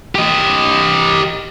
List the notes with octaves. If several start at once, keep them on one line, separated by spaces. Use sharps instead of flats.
G4 D#5